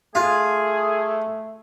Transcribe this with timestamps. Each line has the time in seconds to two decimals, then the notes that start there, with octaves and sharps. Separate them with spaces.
0.15 A3 F4 G#4